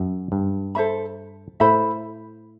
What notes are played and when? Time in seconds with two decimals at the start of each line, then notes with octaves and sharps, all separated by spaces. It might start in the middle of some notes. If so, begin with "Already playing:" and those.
Already playing: F#2
0.32 G2
0.75 A4 C5 E5 B5
1.60 A2 A4 C5 E5 B5